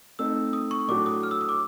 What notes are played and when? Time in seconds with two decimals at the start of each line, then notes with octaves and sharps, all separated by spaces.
0.19 A3 C4 D#4 E6
0.53 D#6
0.71 C#6
0.88 A2 F#3 A3 D4 F#4 D6
1.06 D#6
1.23 F6
1.31 E6
1.41 D#6
1.49 D6